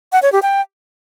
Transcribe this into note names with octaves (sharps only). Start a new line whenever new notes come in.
F#5
C#5
G4
G5